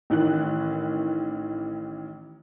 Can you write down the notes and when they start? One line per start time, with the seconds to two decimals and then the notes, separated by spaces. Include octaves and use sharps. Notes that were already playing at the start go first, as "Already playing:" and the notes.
0.10 A1 D#3 E3 F#6